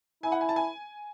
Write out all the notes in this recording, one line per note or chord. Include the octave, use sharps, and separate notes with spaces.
E4 G#5
F#5
G#5
A5
G#5